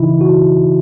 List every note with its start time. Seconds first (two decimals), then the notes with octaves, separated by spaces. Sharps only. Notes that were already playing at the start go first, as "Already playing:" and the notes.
Already playing: C#3 E3 D#4 E4
0.21 F#4